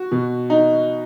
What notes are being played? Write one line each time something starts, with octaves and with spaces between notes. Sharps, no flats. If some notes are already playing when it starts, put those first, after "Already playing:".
Already playing: F#4
B2
D#4